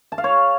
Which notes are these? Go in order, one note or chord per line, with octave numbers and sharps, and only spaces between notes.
A5
F5
C#5